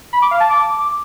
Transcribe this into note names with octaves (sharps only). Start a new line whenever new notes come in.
B5
D6
F5
A5
D6